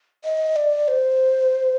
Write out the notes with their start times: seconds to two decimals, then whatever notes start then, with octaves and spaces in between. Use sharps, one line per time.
0.24 D#5
0.56 D5
0.88 C5